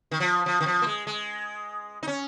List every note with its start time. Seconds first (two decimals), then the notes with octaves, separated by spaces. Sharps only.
0.11 D#3
0.20 F3
0.46 F3
0.61 D#3
0.66 F3
0.82 A#3
0.87 G#3
1.07 G#3
2.03 D#4
2.07 C#4